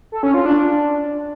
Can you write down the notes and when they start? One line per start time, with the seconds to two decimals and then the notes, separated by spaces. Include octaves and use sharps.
0.12 A4
0.23 C#4
0.34 F4
0.45 D4